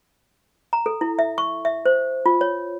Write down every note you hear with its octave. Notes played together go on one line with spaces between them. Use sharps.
A#5
A4
E4
E5
C#6
E5
C5
F4
C#5